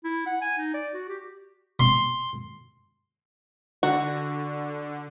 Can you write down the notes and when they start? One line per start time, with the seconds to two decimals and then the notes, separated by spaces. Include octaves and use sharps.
0.04 E4
0.26 F#5
0.42 G#5
0.58 D#4
0.74 D5
0.94 F#4
1.09 G4
1.80 C6
3.83 D3 F#4